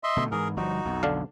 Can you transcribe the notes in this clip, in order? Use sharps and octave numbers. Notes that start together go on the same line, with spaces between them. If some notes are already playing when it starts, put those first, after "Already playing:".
D#5 E5 C6
B2 D3 A3
G#2 E3 G#4 A#4
G1 F3 G3 D#4 F#4
B1 F2
D3 D4 F5